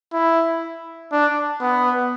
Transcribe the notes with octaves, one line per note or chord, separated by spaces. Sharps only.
E4
D4
B3